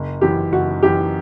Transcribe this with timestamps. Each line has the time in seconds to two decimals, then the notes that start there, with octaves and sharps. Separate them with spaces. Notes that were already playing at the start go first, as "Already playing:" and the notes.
Already playing: F#1
0.21 F#2 E3 G4
0.52 F#1 F#4
0.83 F#2 E3 G4